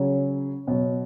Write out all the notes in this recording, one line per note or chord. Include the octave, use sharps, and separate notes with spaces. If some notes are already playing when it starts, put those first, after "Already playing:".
Already playing: C#3 F#3
B2 F#3